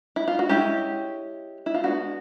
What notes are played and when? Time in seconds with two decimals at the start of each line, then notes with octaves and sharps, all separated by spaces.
0.16 E4
0.28 F4
0.39 F#4
0.49 G#3 C#4 E4 G4
1.66 E4
1.74 F4
1.84 G#3 B3 D4 F#4